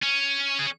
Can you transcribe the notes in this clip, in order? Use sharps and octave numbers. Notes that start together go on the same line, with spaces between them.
C#4
G#4